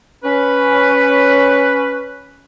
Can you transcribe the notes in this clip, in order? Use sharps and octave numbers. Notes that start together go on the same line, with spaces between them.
C#4 B4